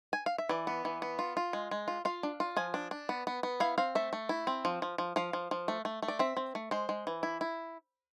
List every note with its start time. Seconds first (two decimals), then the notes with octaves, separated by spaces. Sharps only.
0.13 G#5
0.26 F5
0.38 E5
0.49 E3 D5
0.67 B3
0.85 E3
1.02 B3
1.19 F4
1.37 F4
1.53 G#3
1.71 G#3
1.88 F4
2.05 F4 F5
2.23 D4
2.40 F4
2.56 F3 G#5
2.74 D4
2.91 D4
3.09 B3
3.27 B3
3.43 B3
3.60 E4 F5
3.78 C4 F5
3.95 A3 E5
4.13 A3
4.29 E4
4.47 C4
4.65 F3
4.82 F3
4.98 F3
5.16 F3 F5
5.33 F3
5.51 F3
5.68 A3
5.85 A3
6.02 A3
6.08 D5
6.19 C4 E5
6.37 C4
6.55 A3
6.71 G#3 C5
6.89 G#3
7.07 E3
7.23 E4
7.41 E4